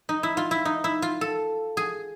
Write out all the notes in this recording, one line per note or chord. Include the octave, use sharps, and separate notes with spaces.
D#4
E4
F4
E4
D#4
E4
F4
A4
G#4